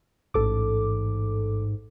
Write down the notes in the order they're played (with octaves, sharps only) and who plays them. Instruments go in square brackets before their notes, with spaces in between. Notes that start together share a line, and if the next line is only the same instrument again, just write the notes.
[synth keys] A1 A4 D6 [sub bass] G#2